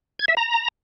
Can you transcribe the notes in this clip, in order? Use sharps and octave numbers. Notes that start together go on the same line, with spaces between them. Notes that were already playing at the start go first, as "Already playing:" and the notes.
G#6
E5
A#5